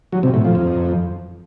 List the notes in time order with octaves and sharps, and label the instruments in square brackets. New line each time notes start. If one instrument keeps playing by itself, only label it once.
[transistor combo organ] F#3
C3
A2
F3
F2